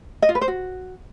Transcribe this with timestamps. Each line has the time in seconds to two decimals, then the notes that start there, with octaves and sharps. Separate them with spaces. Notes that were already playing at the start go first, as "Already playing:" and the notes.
0.22 D#5
0.29 F4
0.35 B4
0.41 C5
0.48 F#4